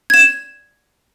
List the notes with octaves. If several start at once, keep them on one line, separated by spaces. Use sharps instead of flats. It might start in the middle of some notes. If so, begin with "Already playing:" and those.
G#6 E7